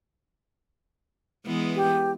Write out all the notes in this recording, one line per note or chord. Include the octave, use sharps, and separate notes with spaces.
E3 G#3 B3
G4